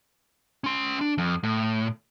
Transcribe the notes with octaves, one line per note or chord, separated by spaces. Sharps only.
C#4 C6
D4
F2
A2